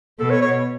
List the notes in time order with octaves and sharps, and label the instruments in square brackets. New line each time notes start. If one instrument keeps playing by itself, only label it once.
[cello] B2 [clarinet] A4
[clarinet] C#5
C#5